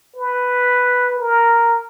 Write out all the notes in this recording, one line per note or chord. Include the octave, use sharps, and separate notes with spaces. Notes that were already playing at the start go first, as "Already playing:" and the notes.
B4
A#4